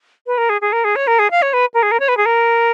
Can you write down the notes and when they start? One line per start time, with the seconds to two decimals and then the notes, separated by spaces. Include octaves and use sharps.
0.27 B4
0.38 A#4
0.49 G#4
0.61 G#4
0.73 A#4
0.84 G#4
0.96 C#5
1.07 A#4
1.19 G#4
1.31 F5
1.42 C#5
1.53 B4
1.74 A#4
1.83 G#4
1.91 A#4
2.00 C#5
2.09 B4
2.17 G#4
2.26 A#4